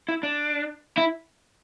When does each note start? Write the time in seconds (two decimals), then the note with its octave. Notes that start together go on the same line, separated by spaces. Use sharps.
0.09 E4
0.23 D4
0.98 E4